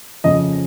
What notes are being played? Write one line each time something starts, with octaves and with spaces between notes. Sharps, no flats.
F2 C#3 F3 D#5